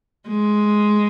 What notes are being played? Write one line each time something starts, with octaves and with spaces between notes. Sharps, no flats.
G#3